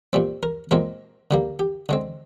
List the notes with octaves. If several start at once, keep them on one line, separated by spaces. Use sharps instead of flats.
A#2 G3 C4
A#4
A#2 G#3 C4 A#4
D3 G3 A#3
G4
D3 G#3 C4